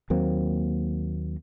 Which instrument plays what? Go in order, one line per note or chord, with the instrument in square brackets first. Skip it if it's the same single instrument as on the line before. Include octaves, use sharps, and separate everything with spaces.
[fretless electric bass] D#2 F#3 A#3 C4